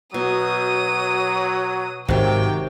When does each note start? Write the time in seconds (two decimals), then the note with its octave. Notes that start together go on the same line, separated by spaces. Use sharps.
0.14 B2 F#3 D#6
2.08 G#1 C3 D#3 F#3 G5